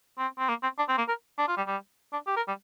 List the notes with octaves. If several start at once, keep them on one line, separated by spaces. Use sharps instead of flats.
C4
C4
A#3
C4
D4
C4
A#3
A#4
D4
F4
G3
G3
D4
G4
A#4
G3